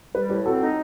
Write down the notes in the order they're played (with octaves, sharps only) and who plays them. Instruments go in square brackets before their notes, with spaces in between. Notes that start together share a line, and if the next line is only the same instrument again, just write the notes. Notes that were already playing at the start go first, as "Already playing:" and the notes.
[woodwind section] G3 [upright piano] G4 B4
[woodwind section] A2 [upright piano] G4 B4
[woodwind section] C4 [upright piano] F#4 A4
[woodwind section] D#4